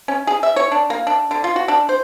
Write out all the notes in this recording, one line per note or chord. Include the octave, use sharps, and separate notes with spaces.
C#4
G#4
E5
C#5
D4
A#3
D4
D3
F4
F#4
D4
C5